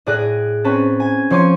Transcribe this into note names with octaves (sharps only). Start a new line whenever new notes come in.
A2 G#4 D5 F#6 A#6 D#7
C4 C#4 B4 A5
G#5
F3 C#5 C6 D6 D#7